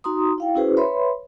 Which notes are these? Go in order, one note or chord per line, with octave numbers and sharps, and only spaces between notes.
D#4 F#4 A#5 C6 D#6
E4 F5 G5
C#4 E4 F#4 G#4 B4 C5
B4 C#5 E5 B5 C6